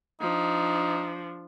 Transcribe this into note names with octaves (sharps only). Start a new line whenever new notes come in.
F3 D4 D#4